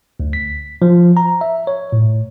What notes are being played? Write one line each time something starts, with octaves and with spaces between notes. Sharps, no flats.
D2
B6
F3
A#5
E5
C#5
A2